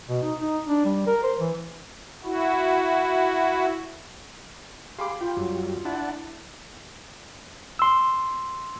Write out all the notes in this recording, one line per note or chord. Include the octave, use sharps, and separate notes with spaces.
B2
D#4
D#4
D4
G3
A#4
C5
E3
E4 F#4
G4 G#4 F5 B5 C6 D6
F4 G5
F#2 F#3 G3
D4 E4 F#5 A5
C6 E6